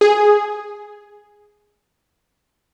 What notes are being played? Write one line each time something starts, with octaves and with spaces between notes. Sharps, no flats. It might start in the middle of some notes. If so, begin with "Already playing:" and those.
G#4